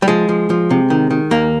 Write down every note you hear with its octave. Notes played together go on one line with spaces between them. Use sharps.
G3
F3 G#3
F3
F3
C3
D#3
D#3
D#2 A#3